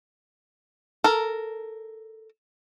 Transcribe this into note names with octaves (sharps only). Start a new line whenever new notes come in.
A4 A#4